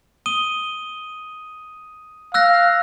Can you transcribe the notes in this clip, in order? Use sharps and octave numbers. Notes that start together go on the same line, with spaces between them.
D#6 D#7 G7
F5 E6 F#6 A#6